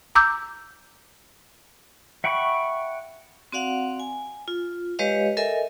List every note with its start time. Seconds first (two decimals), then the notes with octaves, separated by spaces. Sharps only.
0.15 A#5 D6 E6 G6
2.24 E5 F#5 G5 B5 C#6
3.52 C4 F#4 D5 F5 F#5
4.00 G#5
4.48 F4
4.99 G#3 G4 B4 C#5 D#5 F5
5.37 A4 A#4 D#5 E5 G#5